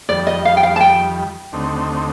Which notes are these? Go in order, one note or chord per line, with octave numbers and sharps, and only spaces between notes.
F2 D#3 G3 D5
D#5
F5
G5
F5
A5
G5
D#2 D3 A3 C4 D#4